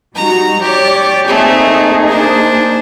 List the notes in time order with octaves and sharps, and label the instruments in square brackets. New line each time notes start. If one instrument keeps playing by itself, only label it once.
[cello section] G3 D#4 F#4 [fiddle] A#5
[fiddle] G4 [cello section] C#5 D5
[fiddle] A3 C4 [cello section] A#3 D#4 G#4
[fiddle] D4 C5